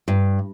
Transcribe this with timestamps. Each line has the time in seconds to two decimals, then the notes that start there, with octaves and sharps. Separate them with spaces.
0.08 G2